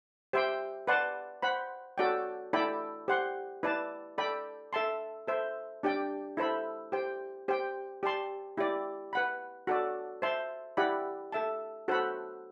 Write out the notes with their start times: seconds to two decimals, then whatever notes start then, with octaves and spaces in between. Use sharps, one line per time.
0.33 G4 C5 E5 G5 C6
0.88 B4 D5 F#5 A5 C6
1.42 C5 F#5 B5
1.98 F#4 A4 D5 G5
2.53 E4 A4 D5 G5 B5
3.08 G4 C5 F#5 C6
3.63 E4 B4 D5 A5
4.18 A4 D5 G5 B5
4.73 A4 E5 A5 C6
5.27 A4 C5 E5
5.83 D4 G4 D5 G5
6.37 E4 A4 C5 E5 B5
6.92 G4 C5 G5
7.48 G4 C5 G5
8.03 G4 D5 A5 C6
8.57 E4 G4 D5
9.13 B4 F#5 B5
9.67 F#4 A4 D5
10.22 C5 E5 A5 C6
10.77 E4 G4 D5 F#5 B5
11.32 A4 E5 A5
11.88 F#4 A4 C5 F#5 B5